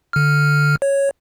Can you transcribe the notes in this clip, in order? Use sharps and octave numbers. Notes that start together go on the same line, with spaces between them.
D3 F6
C#5